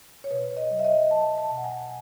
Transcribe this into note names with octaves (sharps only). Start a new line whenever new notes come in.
C#5
B2 B4
D#5
F#3
E5
D#5
F#3 A5
A5
B2
F#5
G#5